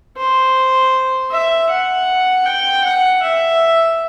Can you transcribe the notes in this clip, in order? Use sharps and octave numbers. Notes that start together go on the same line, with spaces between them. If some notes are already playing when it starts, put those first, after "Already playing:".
C5
E5
F#5
G5
F#5
E5